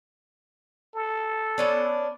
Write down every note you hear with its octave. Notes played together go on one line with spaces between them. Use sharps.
A4
B3 C#4 D4